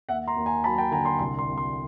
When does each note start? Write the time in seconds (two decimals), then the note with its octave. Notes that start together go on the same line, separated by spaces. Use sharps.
0.09 D#2 E5 F#5
0.27 A#5 C6
0.36 D#2
0.46 G#5 A#5
0.64 F#3 A5 B5
0.73 A#5
0.78 G5 A5
0.91 D3 G#5 A#5
1.05 A#5 C6
1.19 C2 C6
1.39 C6
1.48 C2
1.58 C6